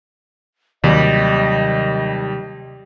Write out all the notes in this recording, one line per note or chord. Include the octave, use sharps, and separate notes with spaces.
D#2 C3 D#3 F#3 G3 D#5